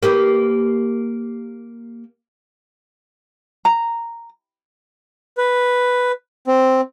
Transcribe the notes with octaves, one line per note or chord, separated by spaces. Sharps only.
A#3 G4 B4
A#5
B4
C4